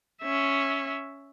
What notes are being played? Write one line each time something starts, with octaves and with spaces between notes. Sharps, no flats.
C#4 E5